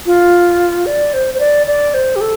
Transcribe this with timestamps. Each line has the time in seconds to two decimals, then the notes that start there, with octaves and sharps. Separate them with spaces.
0.06 F4
0.86 D5
1.14 C5
1.34 C5
1.40 D5
1.67 D5
1.94 C5
2.16 G4
2.21 A4